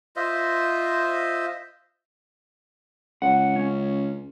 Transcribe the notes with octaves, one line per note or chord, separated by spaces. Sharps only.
F4 C5 D#5 E5
C#2 F#5
C#4